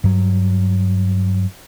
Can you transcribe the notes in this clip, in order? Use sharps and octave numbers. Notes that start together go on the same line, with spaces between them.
G2 F#3